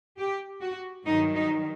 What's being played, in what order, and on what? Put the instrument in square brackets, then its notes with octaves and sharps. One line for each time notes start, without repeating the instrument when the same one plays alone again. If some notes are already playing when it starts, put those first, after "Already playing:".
[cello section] G4
F#4
G2 D#3 F#3 D#4
D#4